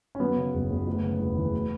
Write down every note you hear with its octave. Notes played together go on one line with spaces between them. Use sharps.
C#4
F#2 B3
C#3
F#1
F#1
D2
C#3
E1
E3
A2